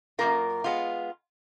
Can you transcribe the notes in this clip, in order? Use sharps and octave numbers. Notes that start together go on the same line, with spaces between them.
F#2 D#3 A#3 F4 A#4
G#3 B3 F4